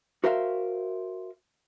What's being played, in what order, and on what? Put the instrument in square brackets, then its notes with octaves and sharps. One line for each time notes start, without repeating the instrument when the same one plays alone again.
[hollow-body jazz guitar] F#4 A#4 C5 E5 F5